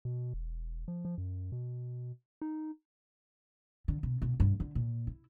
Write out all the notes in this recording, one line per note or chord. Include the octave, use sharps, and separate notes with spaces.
B2
E1
F3
F3
F#2
B2
D#4
D3
B2
B2
G2
D3
A#2
E4